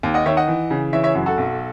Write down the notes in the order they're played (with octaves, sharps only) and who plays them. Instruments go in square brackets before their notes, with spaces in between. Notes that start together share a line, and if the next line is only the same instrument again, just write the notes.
[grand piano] D#2
D#5 F#5
D#3 C#5 E5
D#5 F#5
E3
C#3
E3 C#5 E5
C#5 E5
F#2 F#4
F#4 A4
B1